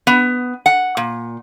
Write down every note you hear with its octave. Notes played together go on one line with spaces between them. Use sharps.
B3
F#5
A#2